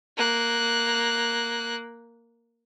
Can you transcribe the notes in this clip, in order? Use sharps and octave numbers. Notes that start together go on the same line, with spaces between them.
A#3 F#6